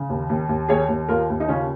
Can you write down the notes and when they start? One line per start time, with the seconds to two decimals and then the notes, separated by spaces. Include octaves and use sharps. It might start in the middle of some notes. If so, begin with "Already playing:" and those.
Already playing: C#3
0.10 D#2
0.30 D#2
0.49 D#2
0.69 D#2 G#4 C#5
0.89 D#2
1.09 D#2 F4 A#4
1.30 D#2
1.40 D#4
1.49 C#3 C#4 F4